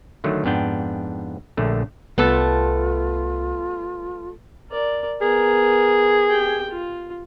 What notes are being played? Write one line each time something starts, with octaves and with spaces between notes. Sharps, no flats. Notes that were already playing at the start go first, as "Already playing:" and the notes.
D3 D#3 F#3 A3
F2 G#2 B3 D4 G5
A#1 D3 A3
C2 G3 A3 B3 F4 A4
A#4 D5
B3 G#4 A#4
G4 G5
F4